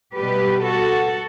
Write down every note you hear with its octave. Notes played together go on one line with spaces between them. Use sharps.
B2 G3 G4 B4
F#4 A4